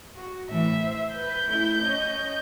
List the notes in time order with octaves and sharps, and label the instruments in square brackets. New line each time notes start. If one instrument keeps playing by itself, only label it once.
[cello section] F#4
[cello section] A2 E3 A3 [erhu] E5
[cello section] C5
[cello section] B4 [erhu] G6
[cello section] A3 C#4 E4
C#4 C#5 D#5